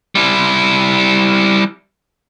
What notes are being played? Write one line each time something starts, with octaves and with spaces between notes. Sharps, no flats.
G3 E4